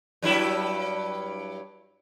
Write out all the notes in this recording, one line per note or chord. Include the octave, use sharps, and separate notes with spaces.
G2 F#3 E4